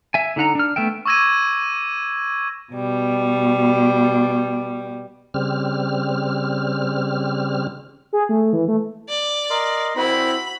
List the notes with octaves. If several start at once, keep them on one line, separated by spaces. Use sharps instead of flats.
E5 G#5
D3 D#4 F#5 A#5
D4 F6
A3 B3 E5 G5
C#6 D6 E6 G#6 A#6 D#7
B2 G3
C#3 G3 C4 F6
G#4
A3
E3
A3
D5
A#4 D#5 C6
C4 E4 F#4 B5